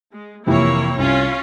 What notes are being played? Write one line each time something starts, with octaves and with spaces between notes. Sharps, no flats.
G#3
F2 C3 E3 A#3 E4 C#5
C2 C#4 F4